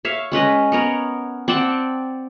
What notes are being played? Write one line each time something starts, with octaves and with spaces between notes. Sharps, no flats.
C#5 E5 F5
G#3 C#4 B4 D#5
B3 A#4 C#5
C4 D5 F#5 A5